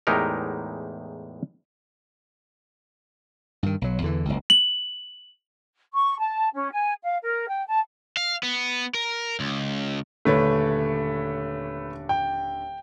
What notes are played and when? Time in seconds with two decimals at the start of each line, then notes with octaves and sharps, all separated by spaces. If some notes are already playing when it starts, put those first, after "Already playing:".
0.07 E2 A2 G#3 D#4 G4 A#4
3.63 G2 D#3
3.81 B1 F#3
4.02 E2 D3 E3
4.25 F#1 C#2
4.50 F#7
5.94 C#6
6.19 A5
6.54 C#4
6.73 G#5
7.03 F5
7.22 A#4
7.48 G5
7.67 A5
8.17 F5
8.43 B3
8.94 A#4
9.40 C#2
10.25 D#1 D3 A3 B4 C#5
12.09 G5